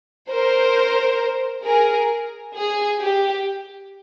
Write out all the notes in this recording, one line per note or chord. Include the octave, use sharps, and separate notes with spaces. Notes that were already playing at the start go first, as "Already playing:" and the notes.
A#4 C5
G#4 A#4
G#4
G4